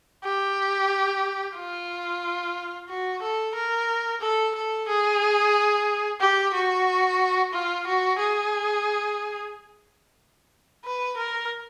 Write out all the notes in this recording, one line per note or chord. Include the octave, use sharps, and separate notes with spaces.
G4
F4
F#4
A4
A#4
A4
A4
G#4
G4
F#4
F4
F#4
G#4
B4
A#4